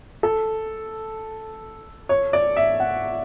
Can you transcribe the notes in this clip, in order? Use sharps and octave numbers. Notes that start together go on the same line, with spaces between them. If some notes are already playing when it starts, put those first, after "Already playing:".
A4
C#5
D5
E5
F#5